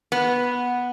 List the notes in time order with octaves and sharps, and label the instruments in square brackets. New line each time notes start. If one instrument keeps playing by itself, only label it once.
[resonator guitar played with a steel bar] B3